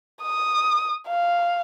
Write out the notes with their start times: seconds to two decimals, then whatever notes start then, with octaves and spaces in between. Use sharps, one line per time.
0.22 D#6
1.08 F5